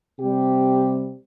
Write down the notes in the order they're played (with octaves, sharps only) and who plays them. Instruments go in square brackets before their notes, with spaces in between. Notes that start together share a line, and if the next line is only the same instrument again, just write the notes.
[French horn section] C3 G3 G4